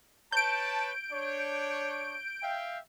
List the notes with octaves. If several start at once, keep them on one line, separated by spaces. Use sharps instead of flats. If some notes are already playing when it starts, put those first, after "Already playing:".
B4 C#5 A5 G6 D7
D4 C#5
E5 F5 G5